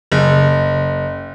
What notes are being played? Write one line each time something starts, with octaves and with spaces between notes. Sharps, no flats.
F#1